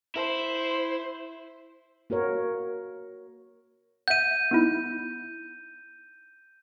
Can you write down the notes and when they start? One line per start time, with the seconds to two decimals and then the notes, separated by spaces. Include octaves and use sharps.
0.16 E4 C5
2.10 A#3 F#4 A#4 C#5
4.08 E5 F#5 G6 D#7
4.51 B3 D#4 E4